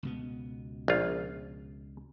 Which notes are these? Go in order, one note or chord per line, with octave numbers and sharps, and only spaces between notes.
C#2 B2 B3
A#1 F4